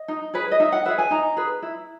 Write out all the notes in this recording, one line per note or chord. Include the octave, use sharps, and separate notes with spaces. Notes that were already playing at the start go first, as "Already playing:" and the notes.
Already playing: D#5
D#4
G#4 B4
D#5
D#4 E5
F#5
G#4 B4 E5
G#5
D#4 A#5
G#4 B4
E4